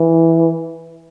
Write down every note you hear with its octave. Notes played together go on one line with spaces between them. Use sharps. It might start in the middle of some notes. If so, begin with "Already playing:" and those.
Already playing: E3